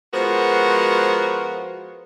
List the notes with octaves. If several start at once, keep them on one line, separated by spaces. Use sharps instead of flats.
F3 G#3 B3 F#4 A#4 C5